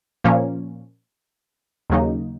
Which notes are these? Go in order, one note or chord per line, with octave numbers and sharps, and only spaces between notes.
A#2 F3 A#3 C#4
D#2 C#3 F#3 A#3 D#4